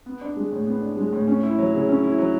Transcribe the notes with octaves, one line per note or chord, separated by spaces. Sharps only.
B3
D4
G#3
A2
B3
D4
G#3
A2
C#4
E4
F#3
C#3
C#4
E4
F#3